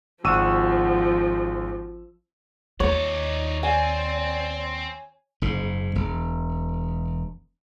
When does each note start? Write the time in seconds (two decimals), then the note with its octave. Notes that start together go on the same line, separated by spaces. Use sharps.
0.24 G#1 F3 F#4 E6 D#7
2.80 D#2 D#4 C#5 D5
3.63 C4 D5 G#5
5.42 F#1 G#2
5.95 E1